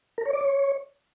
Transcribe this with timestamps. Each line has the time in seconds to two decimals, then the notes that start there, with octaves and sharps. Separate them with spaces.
0.18 A#4
0.26 C#5
0.33 D5
0.41 C#5